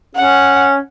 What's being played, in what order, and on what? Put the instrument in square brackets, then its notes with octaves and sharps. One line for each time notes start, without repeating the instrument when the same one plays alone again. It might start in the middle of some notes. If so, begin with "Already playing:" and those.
[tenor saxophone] C#4 [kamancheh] F#5